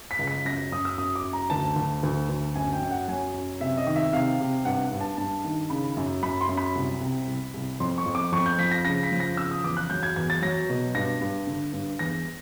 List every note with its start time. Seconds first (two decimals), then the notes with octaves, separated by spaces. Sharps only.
0.11 B6
0.19 C#2
0.27 B6
0.45 F#2 A#6
0.72 F#2 D#6
0.85 E6
0.98 F#2 D#6
1.16 D6
1.25 F#2
1.33 A#5
1.50 D2 A5
1.76 D2
2.03 D2
2.29 D2
2.55 F#2 G#5
2.73 G5
2.82 F#2
2.91 F#5
3.08 F#3 G#5
3.34 F#2
3.60 C3 E5
3.77 D#5
3.87 D#3
3.96 E5
4.13 C3 F5
4.40 C3
4.65 G2 F#5
4.91 G2
5.01 A5
5.17 G2 A5
5.44 D#3
5.70 C#3 B5
5.97 F#2
6.23 F#2 B5
6.41 C6
6.49 F#2
6.58 B5
6.75 C2
7.01 C3
7.28 C2
7.54 C2
7.80 F2 C6
7.98 C#6
8.06 F2
8.15 D6
8.32 F2 C#6
8.46 G6
8.58 F3 B6
8.71 A#6
8.85 C#3 A#6
9.03 B6
9.12 F3
9.20 A#6
9.37 C#3 E6
9.51 D#6
9.64 E2 D6
9.77 F#6
9.90 F#3 G6
10.03 G#6
10.16 E2 G#6
10.30 A6
10.42 F#3 A#6
10.69 B2
10.95 G2 A#6
11.21 G2
11.47 D3
11.73 G2
11.99 E2 A#6